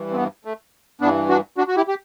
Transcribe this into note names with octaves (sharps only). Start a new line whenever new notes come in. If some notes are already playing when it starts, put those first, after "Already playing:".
Already playing: G2 E3
C4
B3
A3
G2 E3 B3 D4
D4 F#4
D4 F#4
F#4
E4 G4
G4